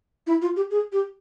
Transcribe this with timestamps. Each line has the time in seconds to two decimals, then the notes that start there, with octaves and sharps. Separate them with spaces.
0.27 E4
0.42 F4
0.56 G4
0.71 G#4
0.93 G4